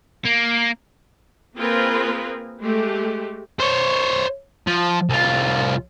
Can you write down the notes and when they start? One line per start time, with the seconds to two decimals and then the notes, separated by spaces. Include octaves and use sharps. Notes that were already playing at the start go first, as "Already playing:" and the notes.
0.25 A#3
1.57 A#3 C4 F4 G#4 A#4 B4
2.62 G#3 A3 G4
3.60 C5 C#5
4.67 F3
5.10 C2 F4